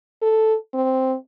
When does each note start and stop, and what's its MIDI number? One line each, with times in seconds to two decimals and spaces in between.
0.22 0.55 69
0.73 1.15 60